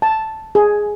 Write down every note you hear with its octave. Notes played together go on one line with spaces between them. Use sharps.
A5
G#4